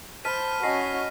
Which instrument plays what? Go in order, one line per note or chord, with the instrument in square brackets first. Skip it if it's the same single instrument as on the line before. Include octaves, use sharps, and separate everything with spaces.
[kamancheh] C5 [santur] A5 B5 [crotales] F6 B6 D#7
[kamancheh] C#4 F#4 [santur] D#5 G#5 [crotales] A#6 C7